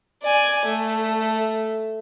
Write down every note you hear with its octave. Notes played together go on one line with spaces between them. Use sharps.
D5 G#5
A3